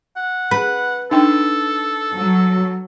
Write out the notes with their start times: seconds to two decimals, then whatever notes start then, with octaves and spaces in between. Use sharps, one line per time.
0.17 F#5
0.51 B4
1.11 D4 D#4 A4 G5
2.17 F#3